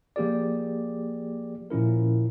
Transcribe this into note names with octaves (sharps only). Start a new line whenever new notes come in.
F3 A#3 G4 G#4 D5
A#2 F3 C#4 E4 A#4